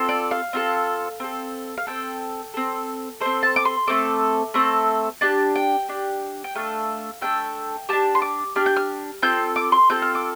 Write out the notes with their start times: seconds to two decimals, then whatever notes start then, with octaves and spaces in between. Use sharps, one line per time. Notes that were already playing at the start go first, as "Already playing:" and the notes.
Already playing: C4 F4 A4
0.09 D5
0.31 F5
0.53 C4 F4 A4
1.20 C4 A4
1.78 F5
1.87 C4 A4 G5
2.54 C4 A4
3.20 C4 A4 C5
3.43 A5
3.56 D6
3.65 C6
3.87 A3 C4 A4 D6
4.54 A3 C4 A4
5.21 D4 G4 A5
5.56 G5
5.88 D4 G4
6.44 G5
6.55 A3 D4 A4 F5
7.22 A3 D4 A4 G5
7.89 D4 G4 A5
8.15 C6
8.22 D6
8.56 D4 G4 F6
8.66 G6
8.77 F6
9.22 C4 F4 A4 G6
9.56 D6
9.72 C6
9.89 C4 F4 A4 G6
10.02 F6
10.15 D6